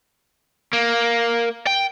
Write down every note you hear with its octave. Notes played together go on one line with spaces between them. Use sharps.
A#3
G5